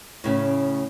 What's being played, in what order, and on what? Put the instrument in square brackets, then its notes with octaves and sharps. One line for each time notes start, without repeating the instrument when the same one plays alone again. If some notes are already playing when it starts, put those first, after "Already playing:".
[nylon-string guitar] A2 C#3 C#4